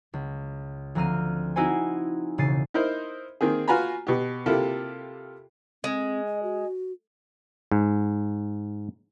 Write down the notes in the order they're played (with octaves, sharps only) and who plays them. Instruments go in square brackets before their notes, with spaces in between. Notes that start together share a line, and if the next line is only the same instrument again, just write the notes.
[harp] C#2
D2 F3 C4 A#5 F6 D#7
C4 D#4 E4 F#4 C5 G#5
E1 C#3 A6 C7 D#7
[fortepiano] D#4 E4 A#4 C5
D#3 A#3 C4 G#4
F4 F#4 B4 G#5 A#5 B5
B2 G4
C3 A#3 E4 F4 G4 A4
[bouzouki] G#3 [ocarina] C4
[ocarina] D#5
F#4
[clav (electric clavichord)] G#2